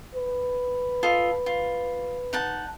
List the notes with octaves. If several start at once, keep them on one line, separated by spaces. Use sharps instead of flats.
B4
F4 A4 D#5
F4
D#4 F#5 A5